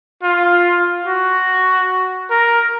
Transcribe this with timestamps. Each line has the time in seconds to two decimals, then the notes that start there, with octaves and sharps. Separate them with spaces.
0.23 F4
1.06 F#4
2.30 A#4